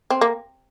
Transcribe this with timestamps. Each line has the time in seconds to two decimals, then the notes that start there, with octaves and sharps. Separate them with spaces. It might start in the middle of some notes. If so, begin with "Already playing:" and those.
0.10 C4
0.21 A#3